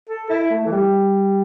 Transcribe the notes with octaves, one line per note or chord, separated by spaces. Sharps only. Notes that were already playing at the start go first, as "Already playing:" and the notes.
A4
E4
A3
E3
G3